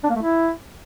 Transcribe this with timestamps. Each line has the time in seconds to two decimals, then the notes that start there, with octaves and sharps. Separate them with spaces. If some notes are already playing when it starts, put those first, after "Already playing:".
0.04 D4
0.10 A#3
0.16 A3
0.22 E4